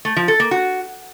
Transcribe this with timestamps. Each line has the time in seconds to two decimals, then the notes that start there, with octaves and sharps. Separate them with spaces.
0.05 A3
0.16 F3
0.28 A4
0.40 A#3
0.51 F#4